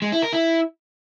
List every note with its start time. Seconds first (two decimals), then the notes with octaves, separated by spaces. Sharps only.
0.02 G#3
0.12 E4
0.22 A#4
0.33 E4